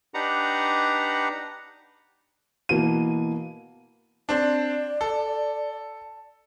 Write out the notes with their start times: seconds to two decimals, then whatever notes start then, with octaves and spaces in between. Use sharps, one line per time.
0.14 D4 D#4 G4 B4 F#5 A#5
2.69 B2 E3 A#3 D#7
4.29 C4 D4 D5
5.01 A4